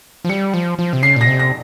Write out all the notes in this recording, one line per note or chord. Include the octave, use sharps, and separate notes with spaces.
F3
G3 C#7
F3
F3
C3
C#3 C7
A#2 A#6
C3
A#6